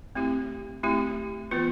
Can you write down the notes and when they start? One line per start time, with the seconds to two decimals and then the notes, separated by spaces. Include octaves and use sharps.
0.15 A3 C4 E4 G4
0.83 A3 C4 E4 G4
1.51 E3 B3 F4 B4